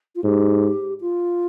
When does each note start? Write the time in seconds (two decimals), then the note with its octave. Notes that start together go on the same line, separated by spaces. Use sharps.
0.15 F4
0.24 G#2 G4
1.01 F4